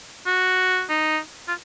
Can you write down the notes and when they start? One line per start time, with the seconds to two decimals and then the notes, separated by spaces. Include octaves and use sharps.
0.26 F#4
0.89 D#4
1.48 F4